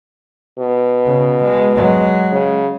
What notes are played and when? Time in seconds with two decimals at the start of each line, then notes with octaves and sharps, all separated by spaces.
0.59 B2
1.05 C#3
1.43 G#3
1.75 F#3 G#3
2.32 C#3